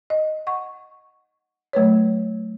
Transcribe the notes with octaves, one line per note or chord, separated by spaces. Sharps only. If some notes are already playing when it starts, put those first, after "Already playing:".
D#5
F#5 C#6
F#3 A3 B4 C#5